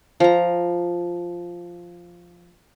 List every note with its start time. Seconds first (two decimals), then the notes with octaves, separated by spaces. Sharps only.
0.20 F3 A#5